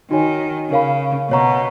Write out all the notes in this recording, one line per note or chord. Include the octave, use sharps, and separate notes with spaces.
D#3 D#4 F#4 C#5 G#5
C#3 A#4 C#5 F5 B5
B2 C#5 F#5 A#5 C#6